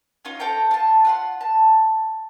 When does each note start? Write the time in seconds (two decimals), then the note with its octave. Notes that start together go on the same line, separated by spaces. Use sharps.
0.25 C#4 D#4 F4
0.40 A4 C5 G5 A#5
0.71 F4 A5
1.05 F4 F#5 C6
1.41 A5